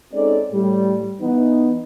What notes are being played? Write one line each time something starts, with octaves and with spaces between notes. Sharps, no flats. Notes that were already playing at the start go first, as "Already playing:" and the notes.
G#3 C4 C#4 D#4 A4 D5
A2 G3
E3 B3 D#4